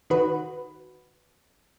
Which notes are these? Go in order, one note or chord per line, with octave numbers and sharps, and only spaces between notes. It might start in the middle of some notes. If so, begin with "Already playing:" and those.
D#3 F#4 B4